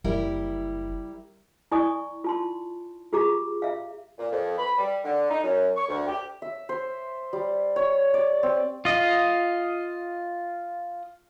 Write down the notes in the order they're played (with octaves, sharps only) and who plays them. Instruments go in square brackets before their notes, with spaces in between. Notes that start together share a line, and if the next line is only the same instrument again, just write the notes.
[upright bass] F#1 [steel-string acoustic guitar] G3 E4 A#4
[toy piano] E4 D5 G#5 C#6 D#6
F4 A5 C6
F4 G4 G#4 A#5 D6
E5 F5
[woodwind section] A#2
F2
B5
G3
D3
D#4
F#2
C#6
D2
G4
[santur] E5
C5
G3
C#5
D5
C4
[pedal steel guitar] F4 D#5